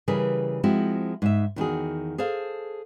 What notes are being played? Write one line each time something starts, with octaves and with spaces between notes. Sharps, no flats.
C#3 E3 G3 G#4 A#4 B4
F3 G#3 C4 E4 F#4
G#2 E5
E2 D#3 F#4 G#4
G#4 A4 C5 F5